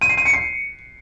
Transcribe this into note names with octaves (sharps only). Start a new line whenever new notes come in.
D#7
C7
D#7
C#7
C7